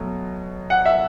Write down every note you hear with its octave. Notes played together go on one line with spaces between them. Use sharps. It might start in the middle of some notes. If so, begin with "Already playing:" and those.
Already playing: B2 F#3 A3
F#5
E5